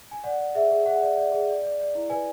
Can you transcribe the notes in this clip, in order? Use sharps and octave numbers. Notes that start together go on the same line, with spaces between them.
G#5
D5 F#5
D5
G#4 E5
G#4
G#4 F#5
D5
D5
G#4
D5
D5
D5
E4
B4 G#5